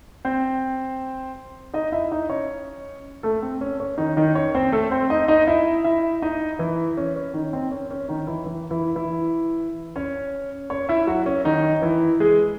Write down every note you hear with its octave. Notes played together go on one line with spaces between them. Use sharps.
C4 C5
D#4 D#5
E4 E5
D#4 D#5
C#4 C#5
A3 A4
C4
C#4
C#4
D#3 D#4
D#3 D#4
C#4 C#5
C4 C5
A3 A4
C4 C5
D#4 D#5
D#4 D#5
E4 E5
E4 E5
D#4 D#5
E3 E4
C#4
C#4
D#3 D#4
C4
C#4
C#4
D#3 D#4
E3 E4
E3 E4
E3 E4
E3 E4
C#4 C#5
C#4 C#5
E4 E5
F#3 F#4
C#4
D#3 D#4
E3 E4
G#3 G#4